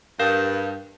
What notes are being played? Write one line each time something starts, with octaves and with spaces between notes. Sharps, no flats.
G2 A#4 F5 G6